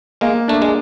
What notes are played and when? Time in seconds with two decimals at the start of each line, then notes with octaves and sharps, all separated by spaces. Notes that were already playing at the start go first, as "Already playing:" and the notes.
0.21 G#3 A#3
0.48 A3 D4
0.62 G#3